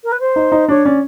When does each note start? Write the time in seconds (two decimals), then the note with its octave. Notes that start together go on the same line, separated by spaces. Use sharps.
0.04 A#4
0.12 B4
0.20 C5
0.36 D#4
0.52 D#4
0.68 D4 C#5
0.85 C#4 D5